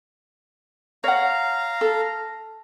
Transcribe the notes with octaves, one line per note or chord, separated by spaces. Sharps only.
C#5 F5 F#5 A#5
A4